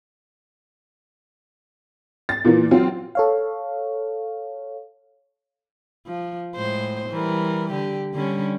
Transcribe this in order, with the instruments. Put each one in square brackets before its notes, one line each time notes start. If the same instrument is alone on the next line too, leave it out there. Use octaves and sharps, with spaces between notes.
[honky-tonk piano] A6
A#2 E3 A#3
F#3 C4 F4
[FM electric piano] A4 C#5 F5
[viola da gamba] F3
A2 G#3 C5
E3 G3 A#4
D3 G4
D3 G3 C#4